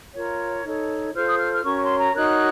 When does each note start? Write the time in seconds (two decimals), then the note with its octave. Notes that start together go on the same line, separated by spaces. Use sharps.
0.14 F4 A#4 C#5
0.65 D#4 A4 C#5
1.15 F4 A4 C5 F6
1.27 D#6
1.40 F6
1.53 F6
1.65 C#4 F#4 A#4 C#5 C#6
1.82 C6
1.98 A#5
2.15 D#4 F#4 A#4 C#5 F#6